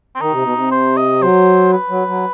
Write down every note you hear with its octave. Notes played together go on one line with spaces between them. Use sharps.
C4
D#3 D#4
C3
B2
C3
C5
D#5
F#3 C5
B4
F#3
F#3